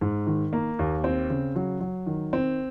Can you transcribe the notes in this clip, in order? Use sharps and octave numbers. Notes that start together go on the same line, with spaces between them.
G#2
D#3
A#3
D#2
C4
C#3
F#3
F#3
D#3
C4